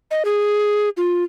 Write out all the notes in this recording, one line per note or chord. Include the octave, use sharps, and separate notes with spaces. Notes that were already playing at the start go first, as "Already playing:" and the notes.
D#5
G#4
F4